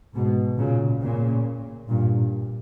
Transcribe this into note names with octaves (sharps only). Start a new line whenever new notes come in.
G#2 B2
A#2 C#3
A#2 C#3
G2 A#2